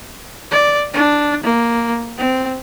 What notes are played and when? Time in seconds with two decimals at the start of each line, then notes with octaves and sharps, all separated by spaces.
0.51 D5
0.93 D4
1.44 A#3
2.17 C4